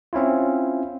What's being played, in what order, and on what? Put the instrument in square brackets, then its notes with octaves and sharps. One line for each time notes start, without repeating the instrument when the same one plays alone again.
[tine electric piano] C4 C#4 E4 F4